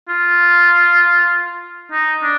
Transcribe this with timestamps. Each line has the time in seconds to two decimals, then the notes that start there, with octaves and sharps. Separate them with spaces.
0.09 F4
1.92 D#4
2.23 D4